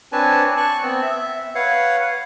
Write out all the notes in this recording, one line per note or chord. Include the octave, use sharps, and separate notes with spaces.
C4 D4 B4 C#5 G#5 A5
A5 C#6 F#6
B3 C4
E5
B4 C#5 F5 F#5